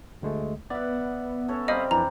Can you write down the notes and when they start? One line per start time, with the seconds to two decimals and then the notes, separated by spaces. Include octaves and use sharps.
0.22 D2 G#3 A3
0.70 B3 D5 E5 F#5
1.48 C#4 A4 C#5
1.68 G3 C4 D#5 F5 A#5 B5 D#6
1.91 F2 E3 D4 A#5